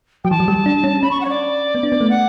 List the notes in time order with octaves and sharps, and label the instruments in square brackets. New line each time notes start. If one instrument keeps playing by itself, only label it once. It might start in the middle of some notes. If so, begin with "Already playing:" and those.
[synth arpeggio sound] F#3 [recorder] G5
[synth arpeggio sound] E3 [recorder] A5
[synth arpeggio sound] F#3
G3
D4
C#4
[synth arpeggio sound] C#4 [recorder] B5
[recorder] C#6
F#5
C#5
D5
[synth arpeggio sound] B3
D4
B3
A3
[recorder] F#5